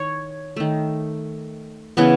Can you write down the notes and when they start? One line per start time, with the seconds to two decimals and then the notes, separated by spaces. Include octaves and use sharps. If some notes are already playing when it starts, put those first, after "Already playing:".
Already playing: D#3 C#5
0.56 D#3 A3
1.97 C#3 E3 B3